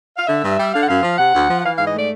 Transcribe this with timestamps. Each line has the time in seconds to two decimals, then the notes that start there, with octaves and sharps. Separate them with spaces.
0.17 F5
0.27 D3 E5
0.43 G2
0.57 G3
0.73 D3 F5
0.82 F#5
0.88 F#2 F5
1.03 F3
1.18 C3 F#5
1.34 D2
1.49 F3
1.59 F#5
1.63 E3 F5
1.75 G#2 F5
1.87 D#5
1.94 A3 D5